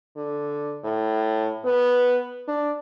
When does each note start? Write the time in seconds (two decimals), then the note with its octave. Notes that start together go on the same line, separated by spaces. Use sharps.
0.17 D3
0.84 A2
1.65 B3
2.48 D4